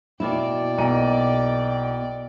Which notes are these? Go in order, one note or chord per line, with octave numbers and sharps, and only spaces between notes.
B2 A#3 E4 D5 G5
B1 A#5 D#7